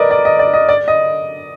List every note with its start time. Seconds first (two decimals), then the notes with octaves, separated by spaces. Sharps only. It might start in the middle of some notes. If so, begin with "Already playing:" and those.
Already playing: A#4 B4 D5 D#5
0.11 D5
0.25 D#5
0.39 D5
0.54 D#5
0.69 D5
0.88 D#5